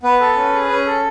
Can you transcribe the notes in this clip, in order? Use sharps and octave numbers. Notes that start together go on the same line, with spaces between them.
B3 B4
A4
C#4
G#4
C#4
A4